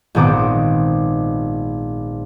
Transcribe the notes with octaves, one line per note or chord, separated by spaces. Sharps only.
A#1 G#2 D#3 B3 C4 D6